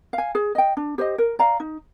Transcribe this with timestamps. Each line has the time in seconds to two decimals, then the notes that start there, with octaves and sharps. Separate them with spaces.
0.13 F5
0.18 G#5
0.35 G#4
0.55 D#5 G5
0.77 D4
0.98 G4 C5 D#5
1.18 A#4
1.39 D5 F5 A#5
1.60 D#4